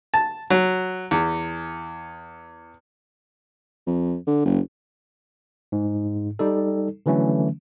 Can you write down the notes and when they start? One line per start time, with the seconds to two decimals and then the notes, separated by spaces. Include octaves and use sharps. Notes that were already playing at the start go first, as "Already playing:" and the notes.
0.14 A5
0.50 F#3
1.11 E2
3.87 F2
4.27 D3
4.45 F#1
5.72 G#2
6.39 G3 D#4 A4
7.06 D3 E3 F#3 A3 C#4